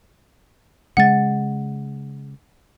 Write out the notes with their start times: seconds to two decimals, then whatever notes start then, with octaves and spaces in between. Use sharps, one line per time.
0.97 C#3 G#3 F#5 A6